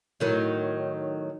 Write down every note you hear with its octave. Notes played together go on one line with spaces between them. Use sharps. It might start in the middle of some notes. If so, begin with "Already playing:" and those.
A2 D#3 F#3